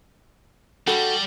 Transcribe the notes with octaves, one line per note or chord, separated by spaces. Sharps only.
G3 F#4 A4